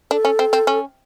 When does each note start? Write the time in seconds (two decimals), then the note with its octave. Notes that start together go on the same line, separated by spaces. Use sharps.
0.11 D4 A4
0.25 C#4
0.39 C4
0.53 C4
0.67 C#4